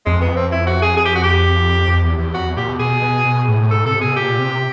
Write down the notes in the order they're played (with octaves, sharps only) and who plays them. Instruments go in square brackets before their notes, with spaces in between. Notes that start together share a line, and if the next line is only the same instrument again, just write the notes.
[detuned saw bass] F2 [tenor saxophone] G#3
[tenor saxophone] B3
C4
E4
F#4
G#4
G#4
G4
F#4
G4
[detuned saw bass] F2
E2
E2
[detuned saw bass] F2 [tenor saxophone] F#4
[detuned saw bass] E2
[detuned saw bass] A#2 [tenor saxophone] G4
[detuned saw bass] B2
[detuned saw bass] B2 [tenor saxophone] G#4
[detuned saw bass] B2
B2
A2
[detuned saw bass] G#2 [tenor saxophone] A4
[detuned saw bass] C3 [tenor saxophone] A4
[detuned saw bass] B2 [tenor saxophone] G#4
[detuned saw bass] A#2 [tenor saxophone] G4
[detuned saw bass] C3